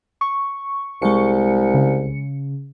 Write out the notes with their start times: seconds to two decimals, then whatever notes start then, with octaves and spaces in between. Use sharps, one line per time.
0.21 C#6
1.02 C2 G#3 C#7
1.74 C#3